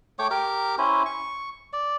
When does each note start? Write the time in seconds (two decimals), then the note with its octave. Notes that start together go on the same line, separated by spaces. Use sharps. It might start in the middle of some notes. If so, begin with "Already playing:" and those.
0.19 A3 C#5 G5 D6
0.31 G4 A#4 D6
0.78 C#4 E4 C5
1.06 C#6
1.73 D5